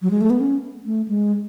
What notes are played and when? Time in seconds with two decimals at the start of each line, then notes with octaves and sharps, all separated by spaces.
0.02 F#3
0.11 G#3
0.21 A3
0.30 B3
0.40 C#4
0.86 A3
1.08 G#3